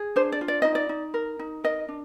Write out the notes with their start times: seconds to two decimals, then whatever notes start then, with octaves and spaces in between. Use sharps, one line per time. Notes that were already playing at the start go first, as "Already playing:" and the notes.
Already playing: G#4
0.16 D4 C5
0.32 D5
0.41 F4
0.48 D5
0.62 D#4 D#5
0.75 D5
0.89 D#4
1.14 A#4
1.39 D#4
1.64 A#4 D#5
1.89 D4